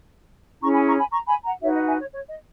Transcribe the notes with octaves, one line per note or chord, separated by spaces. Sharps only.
C#4 E4 G#4 C#5 A#5 C#6
G#5 B5
A#5 C#6
G#5 B5
A#5 C#6
G#5 B5
F#5 A#5
D#4 F#4 B4 C#5 E5
D#5 F#5
E5 G#5
C#5
C#5
D#5